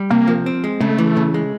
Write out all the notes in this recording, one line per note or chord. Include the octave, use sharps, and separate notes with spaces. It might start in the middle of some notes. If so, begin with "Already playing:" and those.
Already playing: G3
C3 A#3
F3
C4
G#3
C#3 A3
E3
C#3
G#3